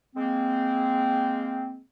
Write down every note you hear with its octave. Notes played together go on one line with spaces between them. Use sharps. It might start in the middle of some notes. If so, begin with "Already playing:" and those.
G#3 A#3 C4